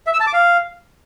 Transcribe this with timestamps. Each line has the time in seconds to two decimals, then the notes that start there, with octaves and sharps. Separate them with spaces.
0.07 E5
0.13 E6
0.20 A5
0.27 D6
0.33 F5